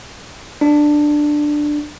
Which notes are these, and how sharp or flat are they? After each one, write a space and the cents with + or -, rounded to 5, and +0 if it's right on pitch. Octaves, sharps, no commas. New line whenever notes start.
D4 +10